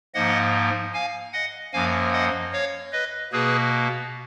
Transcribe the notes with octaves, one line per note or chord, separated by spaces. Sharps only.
G#2 F3 A#3 D#5 F#5
F5 G#5
D#5 F#5
F#2 F3 A#3 F5 G#5
D#5 F#5
C#5 F5
B4 D#5
B2 A#3 G#4 B4